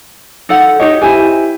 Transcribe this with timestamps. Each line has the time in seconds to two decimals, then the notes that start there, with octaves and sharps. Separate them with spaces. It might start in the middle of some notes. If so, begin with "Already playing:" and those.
0.49 D#4 A4 F#5
0.80 D#4 G4 C#5 D#5
1.02 E4 G4 C5 G#5